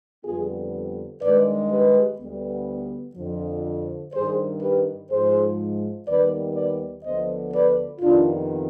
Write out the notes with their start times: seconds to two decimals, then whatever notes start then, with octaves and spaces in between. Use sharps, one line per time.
0.24 F2 D3 G3 B3 F4 G#4
1.21 G2 D#3 G#3 B4 D5
1.70 G4 B4
2.19 D2 D3 G3 B3
3.15 F2 D3 F3
4.13 G2 D#3 G3 G#4 C5
4.61 G4 B4
5.09 G#2 F3 G#3 G#4 C5
6.07 D#2 D#3 G3 B3 B4 D5
6.55 B4 D5
7.04 D2 D3 F3 B3 C5 D#5
7.53 B4 D5
8.00 F2 C3 D#3 B3 D4 F4